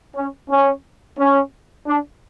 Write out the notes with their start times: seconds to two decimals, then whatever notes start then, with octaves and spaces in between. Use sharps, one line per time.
0.16 C#4
0.50 C#4
1.18 C#4
1.87 D4